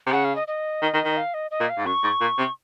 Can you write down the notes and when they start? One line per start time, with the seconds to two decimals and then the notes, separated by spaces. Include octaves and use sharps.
0.06 C3
0.12 C#3 F#5
0.24 F5
0.36 D#5
0.47 D#5
0.82 D#3
0.94 D#3
1.05 D#3
1.17 F5
1.34 D#5
1.51 D#5
1.60 A#2
1.69 F5
1.78 G#2
1.86 F#2 C#6
2.03 G#2
2.21 A#2
2.38 C3